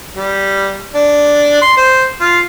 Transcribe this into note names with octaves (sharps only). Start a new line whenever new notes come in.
G3
D4
C6
C5
F4